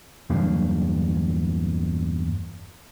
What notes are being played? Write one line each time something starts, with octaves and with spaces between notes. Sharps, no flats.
E2 G2 F#3 A#3